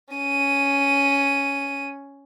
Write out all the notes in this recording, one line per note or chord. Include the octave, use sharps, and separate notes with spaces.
C#4 D#7